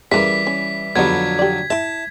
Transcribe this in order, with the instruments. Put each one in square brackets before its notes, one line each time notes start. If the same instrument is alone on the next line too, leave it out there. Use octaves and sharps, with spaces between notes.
[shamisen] C#3 D4 A#4 [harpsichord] E3 G3 [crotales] B6
[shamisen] C#4
[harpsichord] F2 D3 F#3 [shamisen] G3 A3 B3 [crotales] G#6
[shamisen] G4 D5
[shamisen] E4 E5 [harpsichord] A5